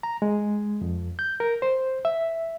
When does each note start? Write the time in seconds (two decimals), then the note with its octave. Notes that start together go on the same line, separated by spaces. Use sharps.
0.03 A#5
0.22 G#3
0.81 F2
1.19 G6
1.40 A#4
1.62 C5
2.05 E5